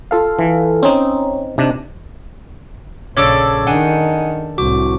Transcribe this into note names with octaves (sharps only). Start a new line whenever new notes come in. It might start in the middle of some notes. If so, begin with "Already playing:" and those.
F4 A4 F5
E3
C4 C#4 D#4
C3 D4 D#4
A#1 C#3 A4 C#5 D5 D6 E6
D#3 D4 D#4 F#5 G#5
C2 A2 F#4 D6